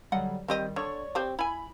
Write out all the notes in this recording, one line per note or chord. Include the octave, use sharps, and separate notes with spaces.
D3 F#3 G3 D#5 F#5
D#3 G3 C4 G4 D#5
D3 C#5 D5 C#6
C4 G4 C5
E4 G#5 B5